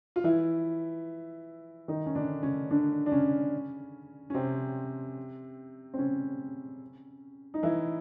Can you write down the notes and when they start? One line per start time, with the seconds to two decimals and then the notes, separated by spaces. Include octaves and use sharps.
0.16 F4
0.24 E3 E4
1.88 D#3 D#4
2.06 C#4
2.15 D3 D4
2.43 C#3 C#4
2.70 D3 D4
3.06 D4
3.12 C#3 C#4
4.30 C#4
4.34 C3 C4
5.94 C4
5.99 C#3 C#4
7.54 D#4
7.63 E3 E4